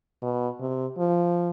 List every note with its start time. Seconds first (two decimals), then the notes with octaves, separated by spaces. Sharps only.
0.22 B2
0.60 C3
0.98 F3